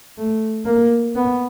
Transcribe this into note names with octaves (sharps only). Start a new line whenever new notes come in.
A3
A#3
B3